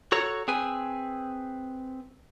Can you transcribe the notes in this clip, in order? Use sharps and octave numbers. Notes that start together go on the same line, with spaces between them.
F#4 A4 C#5 A#5
C4 G#4 B4 G#5